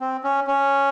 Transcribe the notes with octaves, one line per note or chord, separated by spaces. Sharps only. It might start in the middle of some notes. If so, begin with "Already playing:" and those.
C4
C#4
C#4